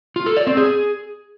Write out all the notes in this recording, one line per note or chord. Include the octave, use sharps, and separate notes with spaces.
F4
A4
D5
C4
G#4